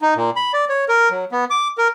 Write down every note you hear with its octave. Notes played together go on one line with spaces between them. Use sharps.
D#4
A#2
B5
D5
C#5
A#4
F#3
B3
D6
A#4